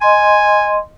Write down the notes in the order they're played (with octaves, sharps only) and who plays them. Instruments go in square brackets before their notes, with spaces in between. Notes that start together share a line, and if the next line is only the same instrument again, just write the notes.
[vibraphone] D#5 C6 [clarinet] G#5